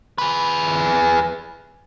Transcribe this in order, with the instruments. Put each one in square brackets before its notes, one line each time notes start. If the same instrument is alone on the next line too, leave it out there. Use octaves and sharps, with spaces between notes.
[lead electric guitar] G#4 B4